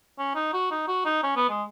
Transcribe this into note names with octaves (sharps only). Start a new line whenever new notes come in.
C#4
D#4
F#4
D#4
F#4
D#4
C#4
B3
G#3